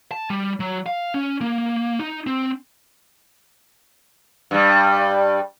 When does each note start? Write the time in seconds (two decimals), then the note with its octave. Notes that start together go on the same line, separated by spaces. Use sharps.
0.11 A5
0.30 G3
0.60 F#3
0.86 F5
1.14 C#4
1.41 A#3
1.99 D#4
2.27 C4
4.51 G2 G3